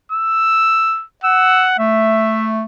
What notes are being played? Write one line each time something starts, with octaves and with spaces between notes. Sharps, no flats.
E6
F#5 E6
A3 E5